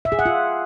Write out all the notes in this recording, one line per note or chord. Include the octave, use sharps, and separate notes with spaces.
E5
G#4
F#5
F4